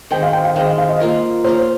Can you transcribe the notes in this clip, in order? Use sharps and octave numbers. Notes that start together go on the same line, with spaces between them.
D#3 G#3 C4 G5
F5
G5
F5
D#3 G#3 C4 F5
F5
F5
D#5
A#3 F4 A#4
A#3 F4 A#4 C5